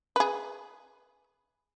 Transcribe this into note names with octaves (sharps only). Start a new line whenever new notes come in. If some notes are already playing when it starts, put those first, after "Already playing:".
G#4 B4